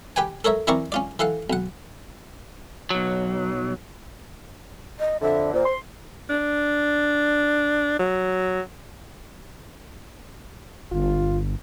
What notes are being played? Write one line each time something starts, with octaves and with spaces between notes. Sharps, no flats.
G4 B4 G5 G#5
A4 A#4 C#5 E5
E3 C4 E4 A#4 D5 C#6
C#4 F4 D5
E3 A4 F5 F#5
B1 F#5
B1 F#3
D#5
F2 D3 E5
A#2 C5
C6
D4
F#3
G1 F4